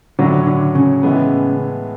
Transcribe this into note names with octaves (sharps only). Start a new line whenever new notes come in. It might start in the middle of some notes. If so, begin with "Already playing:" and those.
A2 D3 F#3 C#4 F#4
D3
C#3
A2 E3 G#3 B3